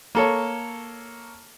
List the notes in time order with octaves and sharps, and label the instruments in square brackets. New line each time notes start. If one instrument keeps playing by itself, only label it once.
[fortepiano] A#3 A4 C#5